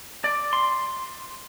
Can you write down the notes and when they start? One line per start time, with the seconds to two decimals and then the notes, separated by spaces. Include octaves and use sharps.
0.24 D5
0.53 C6